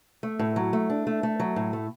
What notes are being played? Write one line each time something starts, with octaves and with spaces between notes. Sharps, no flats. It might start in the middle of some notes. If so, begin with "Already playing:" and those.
A3
A2
F#3
A3
D4
A3
A3
F#3
A2
A3